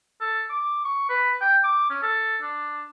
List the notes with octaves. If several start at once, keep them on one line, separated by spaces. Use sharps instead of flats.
A4
D6
C#6
B4
G5
D6
C#4
A4
D4